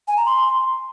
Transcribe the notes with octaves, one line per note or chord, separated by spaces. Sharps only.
G#5
A#5
C6